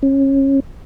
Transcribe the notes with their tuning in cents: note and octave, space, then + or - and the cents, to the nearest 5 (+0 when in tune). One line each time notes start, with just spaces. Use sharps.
C#4 -25